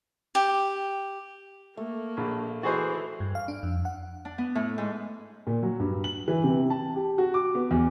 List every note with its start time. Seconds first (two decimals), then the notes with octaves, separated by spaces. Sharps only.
0.35 G4
1.77 A3 A#3
2.17 A#1
2.63 E3 F#4 G#4 C5
3.20 G2
3.35 F5
3.48 D4
3.63 F2
3.85 F#5
4.25 D4
4.38 B3
4.55 A2
4.78 G#2
5.47 A#2
5.63 F#3
5.80 G2
6.04 F#7
6.28 E3
6.44 C3
6.70 A5
6.96 G4
7.18 F#4
7.34 D6
7.55 B3
7.71 E2